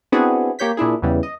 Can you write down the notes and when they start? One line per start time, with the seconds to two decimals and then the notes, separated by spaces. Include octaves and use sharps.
0.12 B3 C4 D4 E4 F#4 G#4
0.59 A#3 G4 C#5 G6 B6
0.77 A#2 D4 E4 G#4
1.02 E2 C#3 E3 G3
1.23 D#5